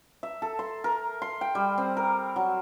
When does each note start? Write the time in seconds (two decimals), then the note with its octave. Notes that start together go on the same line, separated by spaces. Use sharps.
0.23 E5
0.42 A4
0.59 C6
0.84 A#4
1.22 C6
1.41 G5
1.55 G3
1.78 C4
1.97 A#4
2.36 F#3